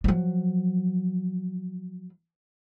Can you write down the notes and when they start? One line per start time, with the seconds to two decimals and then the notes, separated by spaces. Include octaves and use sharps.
0.04 F3 F#3